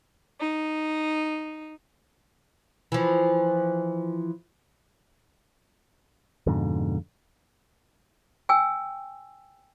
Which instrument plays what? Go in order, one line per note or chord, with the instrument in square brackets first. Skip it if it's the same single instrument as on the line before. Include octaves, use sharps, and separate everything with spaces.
[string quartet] D#4
[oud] E3 F3
[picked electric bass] F2 G#2 B2 D3
[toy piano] G5 G#5 E6